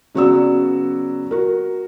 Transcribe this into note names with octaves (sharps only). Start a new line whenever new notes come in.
C#3 F#3 B3 F#4 D5 E6
F#4 A#4